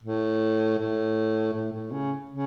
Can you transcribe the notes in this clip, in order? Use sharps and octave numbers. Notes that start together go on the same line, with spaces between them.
A2
A2
A2
A2
C#3
C#3